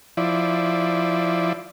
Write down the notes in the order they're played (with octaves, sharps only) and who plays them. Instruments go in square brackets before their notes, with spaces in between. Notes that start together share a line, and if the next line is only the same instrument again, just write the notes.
[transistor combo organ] F3 E4 D5